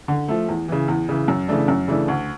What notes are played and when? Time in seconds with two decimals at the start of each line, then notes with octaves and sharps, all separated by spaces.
0.08 D3
0.28 F3 A3
0.48 E2
0.68 C#3 E3
0.88 E2
1.09 C#3 E3
1.28 F#2
1.48 C#3 E3 A3 D4
1.68 F#2
1.88 C#3 E3 A3 D4
2.08 D2